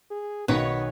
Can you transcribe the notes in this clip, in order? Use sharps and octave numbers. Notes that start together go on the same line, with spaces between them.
G#4
B1 D#3 B3 B4 C#5